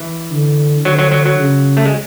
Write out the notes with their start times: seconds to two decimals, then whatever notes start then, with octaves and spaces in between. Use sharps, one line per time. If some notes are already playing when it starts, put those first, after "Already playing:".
Already playing: E3
0.31 D3
0.85 D3 F#3
0.99 F#3
1.12 F#3
1.26 F#3
1.39 C#3
1.77 A3
1.86 G#3